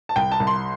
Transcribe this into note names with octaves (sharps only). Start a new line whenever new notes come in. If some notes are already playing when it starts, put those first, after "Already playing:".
A5
C2 G5
A5
C2
C6